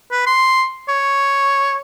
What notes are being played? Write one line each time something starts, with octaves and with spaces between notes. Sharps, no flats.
B4
C6
C#5